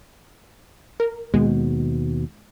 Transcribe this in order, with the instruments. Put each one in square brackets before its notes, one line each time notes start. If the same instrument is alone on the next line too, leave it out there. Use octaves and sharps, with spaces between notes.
[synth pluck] A#4
[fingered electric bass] D#2 B2 [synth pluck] G#3